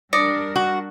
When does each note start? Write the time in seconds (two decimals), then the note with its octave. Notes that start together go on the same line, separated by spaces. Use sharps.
0.13 G3 D4 A#4 D5 D#6 A#6 C#7
0.56 F#4